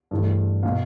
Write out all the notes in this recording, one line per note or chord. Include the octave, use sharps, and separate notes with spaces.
G2 E3 A3
B2 F5